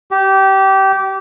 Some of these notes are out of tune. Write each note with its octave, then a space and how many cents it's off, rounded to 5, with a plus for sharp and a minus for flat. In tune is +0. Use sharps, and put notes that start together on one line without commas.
G4 -20